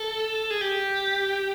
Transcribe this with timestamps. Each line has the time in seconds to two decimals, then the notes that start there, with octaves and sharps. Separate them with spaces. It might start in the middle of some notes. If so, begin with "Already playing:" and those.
Already playing: A4
0.50 G#4
0.61 G4